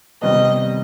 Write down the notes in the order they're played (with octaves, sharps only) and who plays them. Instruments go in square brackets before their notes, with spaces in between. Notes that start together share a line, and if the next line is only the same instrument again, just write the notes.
[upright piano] C3 D#3 G3 B3 [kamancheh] D#5